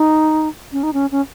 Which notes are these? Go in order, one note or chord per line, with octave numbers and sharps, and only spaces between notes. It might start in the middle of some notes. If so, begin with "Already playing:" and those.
Already playing: D#4
C#4
D#4
C#4
C#4